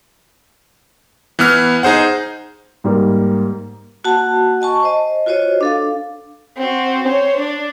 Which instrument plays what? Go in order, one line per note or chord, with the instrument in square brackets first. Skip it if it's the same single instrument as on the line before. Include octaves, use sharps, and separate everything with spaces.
[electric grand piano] E3 B3 F6
D#4 G#4 C5 F#5
[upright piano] G#2 G3 A#3
[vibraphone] A#3 F#4 F#5 A5
D#5 G#5 A5 C#6
C5 D#5
F4 F#4 C5 C#5 D#5
D4 A4 F5
[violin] C4 F#4
C5 C#5
D4 D5